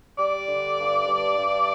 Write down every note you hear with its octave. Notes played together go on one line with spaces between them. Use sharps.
G3 D5
D3
G2
G2
G2